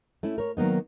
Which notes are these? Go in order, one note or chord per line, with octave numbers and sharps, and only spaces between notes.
A3 C#4 E4
A#4 C#5
D#3 F#3 A#3 B3 D#4